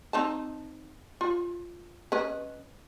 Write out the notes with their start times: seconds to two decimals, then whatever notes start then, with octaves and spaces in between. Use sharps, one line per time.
0.13 C4 D#4 A5
1.21 F4
2.12 C#4 B4 D#5